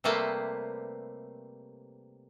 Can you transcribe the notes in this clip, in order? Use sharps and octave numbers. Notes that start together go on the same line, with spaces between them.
C3 G3 A3 A#3 B4 C5